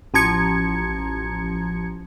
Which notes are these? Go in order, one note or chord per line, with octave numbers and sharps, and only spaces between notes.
A1 F3 A#5 G#6 C#7